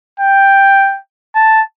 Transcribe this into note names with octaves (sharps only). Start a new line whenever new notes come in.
G5
A5